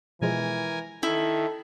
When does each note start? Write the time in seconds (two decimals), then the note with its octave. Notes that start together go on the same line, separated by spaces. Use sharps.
0.21 B2 E3 F3 G#3 A#4 G#5
1.03 D#3 E4 A4